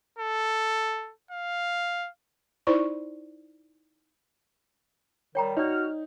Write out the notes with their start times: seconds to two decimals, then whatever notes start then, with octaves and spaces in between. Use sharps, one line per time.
0.18 A4
1.31 F5
2.67 D#4 E4 C5 D5 C#6
5.35 D#3 G3 C#5 G5 A#5
5.57 D#4 F#4 C#5 D5 F6